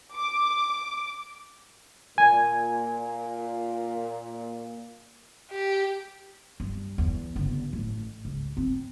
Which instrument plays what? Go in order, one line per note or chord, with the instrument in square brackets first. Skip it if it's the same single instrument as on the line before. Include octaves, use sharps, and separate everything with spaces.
[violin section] D6
[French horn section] A#2 [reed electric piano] G#5
[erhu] G4
[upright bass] G2
E2
G1 C#3
A1
C#2
C4